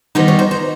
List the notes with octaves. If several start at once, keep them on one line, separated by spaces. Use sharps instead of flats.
D#3 G3 B3 D#4 C5
C#5
C5
C5